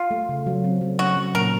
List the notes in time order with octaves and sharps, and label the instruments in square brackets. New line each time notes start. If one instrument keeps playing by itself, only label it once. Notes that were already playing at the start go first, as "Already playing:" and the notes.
Already playing: [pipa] F4
[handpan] A3
C#3
F#3
C4
F#3
[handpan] C#4 [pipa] F#4
[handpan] F#3
[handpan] A#2 [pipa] A#4